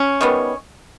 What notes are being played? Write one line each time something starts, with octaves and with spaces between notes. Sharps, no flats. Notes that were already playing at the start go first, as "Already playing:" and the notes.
Already playing: C#4
D#3 G3 B3